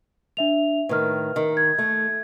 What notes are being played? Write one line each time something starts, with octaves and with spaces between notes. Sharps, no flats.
D4 E5 F7
A2 D#3 B4 F6
D#3
G#6
A3